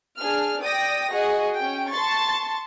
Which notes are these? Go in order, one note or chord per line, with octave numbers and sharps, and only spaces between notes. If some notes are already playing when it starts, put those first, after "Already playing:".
D4 G#4 F6
D5 G5 D#6 A#6
F#4 G#4 D#5
C#4 G5
A5 C6 C#6 A6